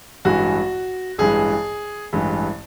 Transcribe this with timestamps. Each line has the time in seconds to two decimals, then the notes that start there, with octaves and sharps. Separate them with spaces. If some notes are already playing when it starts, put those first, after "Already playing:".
0.25 A1 G2 E3 G#3 F#4
1.18 A1 G2 E3 G#3 G#4
2.13 A1 G2 E3 G#3